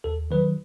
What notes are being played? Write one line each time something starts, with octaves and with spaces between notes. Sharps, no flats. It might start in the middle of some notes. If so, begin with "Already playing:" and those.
D#2 A4
D#3 F#3 B4